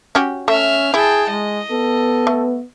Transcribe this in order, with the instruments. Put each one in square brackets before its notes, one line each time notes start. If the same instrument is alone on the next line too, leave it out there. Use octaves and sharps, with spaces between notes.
[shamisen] C#4 F#4 G4
[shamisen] A3 [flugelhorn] C#4 [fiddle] E5 F6
[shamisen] E4 [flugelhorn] G#4 [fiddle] G5 A5
[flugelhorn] G#3 [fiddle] D#5
[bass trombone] B3 [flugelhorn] A4
[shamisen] A3